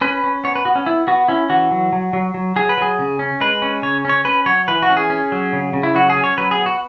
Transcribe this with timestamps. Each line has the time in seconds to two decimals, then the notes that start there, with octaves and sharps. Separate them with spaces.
0.01 C#4 B4
0.24 C#4
0.44 B3 C#5
0.56 B4
0.65 B3 F#4
0.76 C#4
0.86 B3 E4
1.07 B3 F#4
1.28 C#4 E4
1.50 E3 F#4
1.71 F#3
1.93 F#3
2.13 F#3
2.34 F#3
2.56 F#3 G#4
2.69 B4
2.78 F#3 G#4
2.99 C#3
3.19 C#4
3.40 G#3 B4
3.62 C#4
3.83 C#3 C#5
4.05 C#4 C#5
4.25 C#4 B4
4.46 F#3 C#5
4.68 E3 B4
4.83 F#4
4.90 C#4
4.97 G#4
5.10 C#4
5.32 F#3
5.53 C#3
5.73 C#3
5.83 E4
5.95 F#3 F#4
6.10 G#4
6.17 C#4
6.24 C#5
6.38 F#3 B4
6.51 G#4
6.58 B3
6.66 F#4